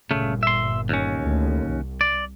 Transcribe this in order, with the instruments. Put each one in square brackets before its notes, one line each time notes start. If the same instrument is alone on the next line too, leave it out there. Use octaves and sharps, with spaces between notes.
[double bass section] G1 A#2 [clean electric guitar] C#3 A3
[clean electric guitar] E5 C6
D#2 C#4
[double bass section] D2
C2
[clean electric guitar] D5